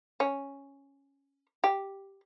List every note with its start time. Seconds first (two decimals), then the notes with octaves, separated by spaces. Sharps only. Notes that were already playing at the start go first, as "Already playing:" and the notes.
0.20 C#4
1.64 G4